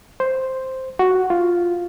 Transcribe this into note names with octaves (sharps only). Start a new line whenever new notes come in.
C5
F#4
F4